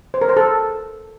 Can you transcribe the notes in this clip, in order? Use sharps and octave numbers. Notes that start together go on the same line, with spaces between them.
C5
A#4
C5
A4